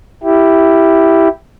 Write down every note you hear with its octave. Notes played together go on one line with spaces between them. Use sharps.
E4 G4